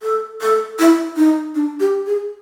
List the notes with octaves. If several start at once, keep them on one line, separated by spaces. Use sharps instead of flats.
A4
A4
E4
D#4
D4
G4
G#4